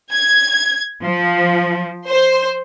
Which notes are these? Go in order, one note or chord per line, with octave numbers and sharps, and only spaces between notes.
G#6
F3
C5